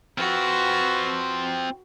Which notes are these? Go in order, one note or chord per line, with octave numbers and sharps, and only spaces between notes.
C4 F4 F#4 B4